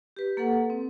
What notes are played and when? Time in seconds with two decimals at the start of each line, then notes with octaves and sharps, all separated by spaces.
0.17 G4 B4
0.37 A#3 A4 B4 F#5
0.70 C4